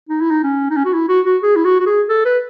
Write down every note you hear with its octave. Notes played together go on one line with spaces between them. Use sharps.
D#4
E4
D#4
C#4
D#4
C#4
F#4
E4
F#4
F#4
G#4
E4
F#4
F#4
G#4
A4
B4